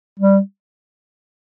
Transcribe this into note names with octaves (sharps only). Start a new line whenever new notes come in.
G3